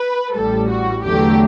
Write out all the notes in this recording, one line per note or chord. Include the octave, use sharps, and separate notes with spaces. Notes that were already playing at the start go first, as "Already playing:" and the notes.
Already playing: B4
A1 A2 G3 A4
F#4
E2 D3 F#3 A3 G4